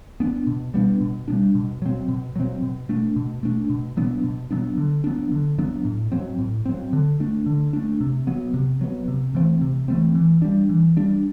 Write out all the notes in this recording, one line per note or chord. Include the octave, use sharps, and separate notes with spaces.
B3 D4
B2
G3 B3 D4
B2
G3 B3 D4
B2
F#3 C4
B2
F#3 C4
B2
A3 D4
B2
A3 D4
B2
F#3 B3 D4
B2
F#3 B3 D4
D3
F#3 B3 D4
D3
F#3 B3 D4
A2
F#3 C4
A2
F#3 C4
D3
A3 D4
D3
A3 D4
C3
F#3 B3
C3
F#3 B3
C3
E3 A3 C4
C3
E3 A3 C4
E3
G3 D4
E3
G3 D4